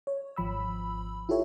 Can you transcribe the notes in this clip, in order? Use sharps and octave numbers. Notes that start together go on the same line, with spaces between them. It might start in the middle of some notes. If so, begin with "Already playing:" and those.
C#5
G#1 F3 B5 E6
E4 F4 G4 A4 C#5 E5